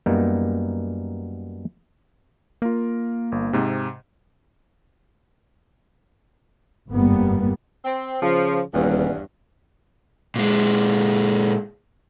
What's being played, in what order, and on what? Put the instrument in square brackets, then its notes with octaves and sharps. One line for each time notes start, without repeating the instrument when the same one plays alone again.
[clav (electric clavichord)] F#2 G3 A#3 B3 D#4 A#4
[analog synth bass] A#3 [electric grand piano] F4 A#4
[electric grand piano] G1
G#2 C3
[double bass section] G1 F2 G#2 G3 A#3 B3
[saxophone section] C4
[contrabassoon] C#3 [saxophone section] F3
[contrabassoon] D#1 [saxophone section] E2 G2
[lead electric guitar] A#2 G#3